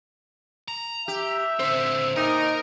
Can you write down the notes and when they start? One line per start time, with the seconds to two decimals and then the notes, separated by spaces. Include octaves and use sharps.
0.68 A#5
1.08 G4 E5
1.59 D3 C4 C5
2.16 A#2 D#4 A#4 D#5